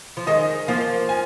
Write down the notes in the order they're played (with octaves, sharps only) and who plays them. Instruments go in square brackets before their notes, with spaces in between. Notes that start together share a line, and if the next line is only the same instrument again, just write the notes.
[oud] F3
[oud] D#3 G#3 [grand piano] D#5
[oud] F3 A#3 [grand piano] F5
[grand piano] G#5